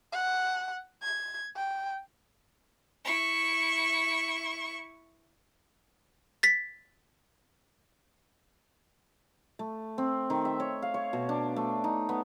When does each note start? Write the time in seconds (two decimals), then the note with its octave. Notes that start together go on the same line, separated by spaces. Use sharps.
0.12 F#5
1.02 G#6
1.56 G5
3.05 E4 C#6
6.43 A6 B6
9.59 A3
9.98 C4
10.30 D#3
10.45 E5
10.60 C#5
10.82 F5
10.94 C#5
11.13 B2
11.29 D4
11.56 A3
11.84 D#4
12.09 B3